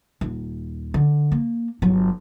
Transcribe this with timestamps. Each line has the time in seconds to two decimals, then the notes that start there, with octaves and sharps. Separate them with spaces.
0.21 D#1
0.94 D3
1.32 A#3
1.82 G1 F#3